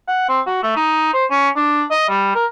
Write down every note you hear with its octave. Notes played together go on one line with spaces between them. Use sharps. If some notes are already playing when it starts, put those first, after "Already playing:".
F#5
C4
F#4
A3
D#4
C5
C#4
D4
D#5
G3
A#4